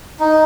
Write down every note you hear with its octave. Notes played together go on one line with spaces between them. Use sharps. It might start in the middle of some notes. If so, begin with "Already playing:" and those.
D#4